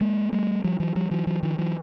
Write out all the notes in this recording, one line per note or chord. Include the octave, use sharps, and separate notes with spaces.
G#3 A#3
G3 A3
F3 G3
E3 F#3
F3 G3
E3 F#3
E3 F#3
D#3 F3
E3 F#3